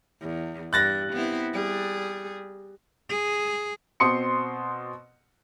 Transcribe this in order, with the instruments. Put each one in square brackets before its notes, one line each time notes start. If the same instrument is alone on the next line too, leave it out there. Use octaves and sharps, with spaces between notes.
[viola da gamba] E2
[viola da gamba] G2 [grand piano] F#6 A6 A#6
[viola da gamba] B3 C4 E4
G3 G#4
[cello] G#4
[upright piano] B2 C4 C6 D#6 C#7